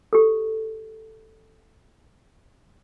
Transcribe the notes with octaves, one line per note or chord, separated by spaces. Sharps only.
G4 A4